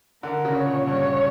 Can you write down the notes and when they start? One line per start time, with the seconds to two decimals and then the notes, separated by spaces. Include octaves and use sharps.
0.23 D3 A#4
0.45 C#3
0.55 C#5
0.66 A#2
0.87 G2 C#5